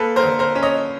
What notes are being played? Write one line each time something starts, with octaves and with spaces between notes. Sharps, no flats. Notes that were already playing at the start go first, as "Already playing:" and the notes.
Already playing: A#3 A4 B4
A#4 C5
D3
A#4 C5
C#4
C#5 D#5